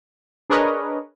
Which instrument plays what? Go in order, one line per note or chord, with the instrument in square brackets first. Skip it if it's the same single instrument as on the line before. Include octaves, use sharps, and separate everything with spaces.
[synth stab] D4 G#4 A#4 B4 C#5 D#5